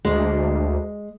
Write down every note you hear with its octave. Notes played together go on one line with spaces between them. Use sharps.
D2 G#3